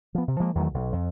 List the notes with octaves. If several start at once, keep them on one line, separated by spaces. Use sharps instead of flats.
F3 B3
C3
F3 G#3 A#3
E2 D#3 F#3 A3
B1
F2